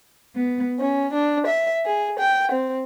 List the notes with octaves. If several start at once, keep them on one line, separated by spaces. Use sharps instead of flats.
B3
C#4
D4
E5
G#4
G5
C4